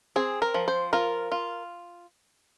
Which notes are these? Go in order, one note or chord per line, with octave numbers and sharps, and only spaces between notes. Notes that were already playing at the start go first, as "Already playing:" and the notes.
C4 G#4
A#4
F3
C5
F4 A#4
F4